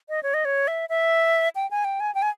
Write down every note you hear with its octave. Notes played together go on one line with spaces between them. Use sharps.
D#5
C#5
D#5
C#5
E5
E5
G5
G#5
G5
G#5
G5
G#5